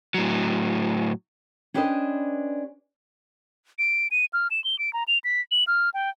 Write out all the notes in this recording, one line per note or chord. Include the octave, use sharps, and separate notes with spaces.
A2 F#3
C#4 D4 G4 B4 C5 D#5
D7
D#7
F6
E7
G7
D7
A#5
F7
B6
F#7
F6
G5